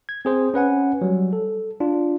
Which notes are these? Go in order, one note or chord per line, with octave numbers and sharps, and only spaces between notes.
G#6
C4 G#4 C5
C#4 B4 F#5 G#5
F#3 G3
A4
D4 F4